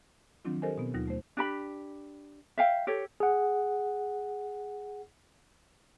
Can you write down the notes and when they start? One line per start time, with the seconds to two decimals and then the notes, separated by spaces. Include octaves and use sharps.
0.45 D#3 F3 F#3 C4 D4 F4
0.62 G4 A4 A#4 C5 D#5 G#5
0.78 B2 B3 C4
0.94 D#2 F#3 D#4 F4 A#6
1.08 A3 C5
1.37 D4 G4 B5
2.58 E5 F5 G5
2.87 G4 A4 C#5
3.20 G#4 F#5